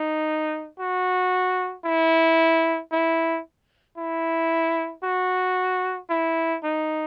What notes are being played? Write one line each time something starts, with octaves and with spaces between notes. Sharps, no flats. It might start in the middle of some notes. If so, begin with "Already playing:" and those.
Already playing: D#4
F#4
E4
E4
E4
F#4
E4
D#4